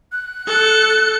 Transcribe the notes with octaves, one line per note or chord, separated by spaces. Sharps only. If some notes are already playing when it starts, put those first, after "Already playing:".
F#6
A4 C#7